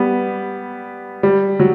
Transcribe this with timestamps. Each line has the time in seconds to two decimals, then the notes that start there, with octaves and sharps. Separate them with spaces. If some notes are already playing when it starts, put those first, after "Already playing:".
Already playing: G3 B3
1.23 G3
1.60 F#3